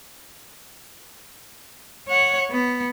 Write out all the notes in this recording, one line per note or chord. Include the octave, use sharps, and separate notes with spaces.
C#5 F#5
B3